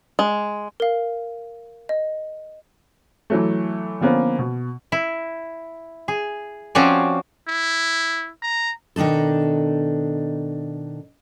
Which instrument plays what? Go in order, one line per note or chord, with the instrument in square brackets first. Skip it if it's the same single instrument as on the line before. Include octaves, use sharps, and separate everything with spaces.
[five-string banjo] G#3
[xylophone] A#4 F5
D#5
[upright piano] E3 F#3 A3
D3 F3 A#3 B3 C#4
B2
[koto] E4
G#4
F3 C4 C#4 F#4 D5 G#5
[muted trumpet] E4
A#5
[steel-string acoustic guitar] B2 D#3 D4 D#4 A4